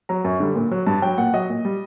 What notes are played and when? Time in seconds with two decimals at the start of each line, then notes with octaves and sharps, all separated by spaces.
0.09 F#3 A#5
0.24 F#2
0.40 D3 G3
0.56 A#2
0.71 F#3
0.86 G2 A5
1.02 F#3 G5
1.18 A#2 F#5
1.34 F#3 D#5
1.50 A#2
1.65 G3